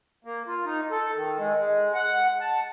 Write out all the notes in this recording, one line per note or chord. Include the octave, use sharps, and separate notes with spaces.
A#3
F4
D#4
A4
D#3
G#3
G#3
F#5
A5